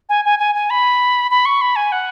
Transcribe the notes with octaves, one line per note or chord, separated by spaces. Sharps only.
G#5
G#5
G#5
G#5
B5
B5
C#6
B5
G#5
F#5